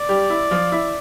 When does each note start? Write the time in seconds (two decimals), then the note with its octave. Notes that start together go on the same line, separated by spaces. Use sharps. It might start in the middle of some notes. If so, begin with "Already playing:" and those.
Already playing: D5
0.09 G3 G4
0.30 E4
0.51 F3 F4
0.72 E4 E5